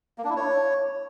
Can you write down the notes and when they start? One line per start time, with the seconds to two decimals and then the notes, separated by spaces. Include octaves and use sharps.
0.18 A#3
0.24 D4
0.30 E4
0.36 C#5